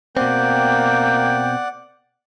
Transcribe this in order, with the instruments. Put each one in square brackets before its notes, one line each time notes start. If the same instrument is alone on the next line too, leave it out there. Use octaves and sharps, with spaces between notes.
[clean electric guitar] B2 C4 [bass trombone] A#3 [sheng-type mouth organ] D5 F#5 [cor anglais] G5